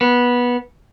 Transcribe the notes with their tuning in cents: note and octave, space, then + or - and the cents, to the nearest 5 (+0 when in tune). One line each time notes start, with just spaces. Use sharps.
B3 -15